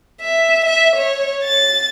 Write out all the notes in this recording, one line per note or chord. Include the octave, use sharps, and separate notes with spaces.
E5
E5
C#5
A6